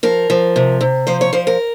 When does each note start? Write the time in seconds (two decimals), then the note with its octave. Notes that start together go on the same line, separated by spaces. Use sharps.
0.03 F3 A#4
0.30 F3
0.56 C3
0.81 C3
1.07 F3 C5
1.21 C#5
1.33 F3 C5
1.47 A#4